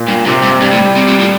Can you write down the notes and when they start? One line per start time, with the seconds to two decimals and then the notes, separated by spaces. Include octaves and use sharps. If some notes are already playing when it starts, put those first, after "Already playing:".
Already playing: A#2
0.08 G2
0.27 G2 C3
0.44 G2
0.62 G2 G3
0.72 A2
0.96 C3
1.08 A#2
1.20 A2